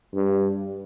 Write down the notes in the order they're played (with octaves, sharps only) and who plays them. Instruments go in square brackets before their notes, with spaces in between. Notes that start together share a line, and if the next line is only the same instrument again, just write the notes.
[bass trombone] G2